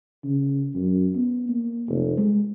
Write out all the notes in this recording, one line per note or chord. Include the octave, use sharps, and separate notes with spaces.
C#3
F#2
B3
A#3
F1
G#3